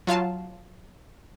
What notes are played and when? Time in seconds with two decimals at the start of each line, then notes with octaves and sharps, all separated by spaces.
0.07 F#3 F4 F5 A5